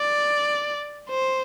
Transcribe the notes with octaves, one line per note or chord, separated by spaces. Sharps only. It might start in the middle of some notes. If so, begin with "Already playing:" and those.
Already playing: D5
C5